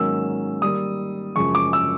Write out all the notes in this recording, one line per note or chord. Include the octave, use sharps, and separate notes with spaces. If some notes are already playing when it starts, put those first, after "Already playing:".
Already playing: G#2 D#3 F#3 A#3 C#4 E6
D#3 G3 A#3 D#6
F#2 C#3 F3 G#3 C#6
D6
E6